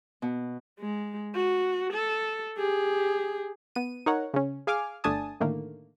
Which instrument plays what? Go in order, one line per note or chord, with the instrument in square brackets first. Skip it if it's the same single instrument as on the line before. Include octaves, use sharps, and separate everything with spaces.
[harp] B2
[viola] G#3
F#4
A4
G4 G#4
[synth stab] B3 D#7
D#4 A#4 C#5 F#5
C#3 C#4
G#4 F5 G#5 D6 F6
G1 A3 D4 G#5 A5 D#6
A2 D3 D#3 A3 A#3